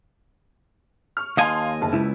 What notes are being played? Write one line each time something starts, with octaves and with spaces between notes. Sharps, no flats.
C#6 F6
D#2 D#5 F5 G#5 A5 C6
F#1 A5
C#2 E4